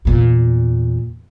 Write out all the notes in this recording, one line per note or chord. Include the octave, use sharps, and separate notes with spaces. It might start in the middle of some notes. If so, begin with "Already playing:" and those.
E2 A#2